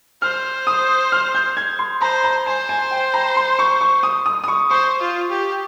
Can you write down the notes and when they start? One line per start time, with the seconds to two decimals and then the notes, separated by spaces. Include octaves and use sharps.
0.22 C5 F6
0.67 D#6
1.12 F6
1.35 G6
1.57 G#6
1.79 C6
2.01 C5 A#5
2.24 A#5
2.46 C5 G#5
2.69 G#5
2.91 G5
3.14 A#5
3.36 C6
3.59 C#6
3.81 C#6
4.03 D#6
4.26 D#6
4.44 D#6
4.48 C#6
4.70 C5 C#6
5.00 F4
5.30 G4